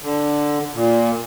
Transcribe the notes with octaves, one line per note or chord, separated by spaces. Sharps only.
D3
A#2